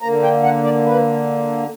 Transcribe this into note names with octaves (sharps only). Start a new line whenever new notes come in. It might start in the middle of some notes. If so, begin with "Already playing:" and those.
D3 A#3 A#5
G5
F#5
D5
B4